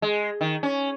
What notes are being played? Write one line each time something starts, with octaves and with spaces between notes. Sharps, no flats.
G#3
D#3
C#4